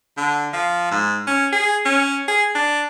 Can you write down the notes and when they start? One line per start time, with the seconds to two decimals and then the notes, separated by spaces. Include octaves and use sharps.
0.17 D3
0.53 F3
0.91 G#2
1.27 C#4
1.52 G#4
1.85 C#4
2.28 G#4
2.55 D4